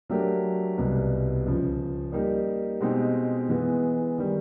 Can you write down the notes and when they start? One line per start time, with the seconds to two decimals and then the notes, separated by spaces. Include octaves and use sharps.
0.09 F#3 A3 D4 G4 A#4
0.77 C2 B2 G3 B3
1.45 C#2 C#3 F3
2.12 G3 A#3 D#4 G4
2.81 B2 G#3 C4 D#4 G4
3.49 E3 G#3 B3
4.18 D#3 G3